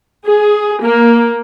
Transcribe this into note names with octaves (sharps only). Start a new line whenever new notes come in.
G#4
A#3